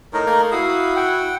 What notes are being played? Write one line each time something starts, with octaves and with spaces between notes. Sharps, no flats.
A2 D#4 A#4
A3 A#3
E4 F#4 F5 D#6
F#5 G5